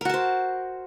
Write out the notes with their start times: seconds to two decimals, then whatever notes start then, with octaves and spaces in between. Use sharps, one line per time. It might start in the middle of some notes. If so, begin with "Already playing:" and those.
0.01 A#4
0.05 F#4
0.09 A5
0.14 C5